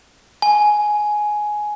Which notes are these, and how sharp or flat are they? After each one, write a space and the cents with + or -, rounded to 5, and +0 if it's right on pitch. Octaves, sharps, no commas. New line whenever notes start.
G#5 +10